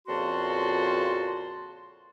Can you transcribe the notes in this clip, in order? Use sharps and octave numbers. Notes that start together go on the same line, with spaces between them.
F2 A#2 C#3 F#4 A5 C6